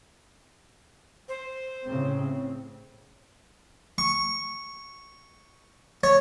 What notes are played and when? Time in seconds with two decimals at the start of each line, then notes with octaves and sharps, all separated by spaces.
1.29 C5
1.85 A2 C#3 C4
3.98 C#6
6.04 C#5